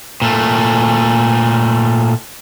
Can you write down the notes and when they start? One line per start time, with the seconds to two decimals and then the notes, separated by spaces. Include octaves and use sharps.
0.22 A#2 A3